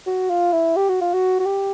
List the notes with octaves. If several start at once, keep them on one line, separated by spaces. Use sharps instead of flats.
F#4
F4
E4
G4
F#4
F4
F#4
F#4
G4